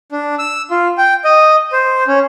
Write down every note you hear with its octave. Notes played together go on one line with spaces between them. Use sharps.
D4
E6
F4
G5
D#5
C5
C#4